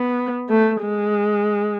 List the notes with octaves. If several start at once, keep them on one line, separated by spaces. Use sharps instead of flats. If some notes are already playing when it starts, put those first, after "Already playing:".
Already playing: B3
A3
G#3